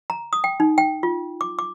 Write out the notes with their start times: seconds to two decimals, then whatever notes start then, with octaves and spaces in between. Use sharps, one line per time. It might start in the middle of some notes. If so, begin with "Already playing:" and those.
0.10 A#5
0.33 D#6
0.44 G5
0.60 D#4
0.78 G5
1.03 F4
1.41 D6
1.59 D6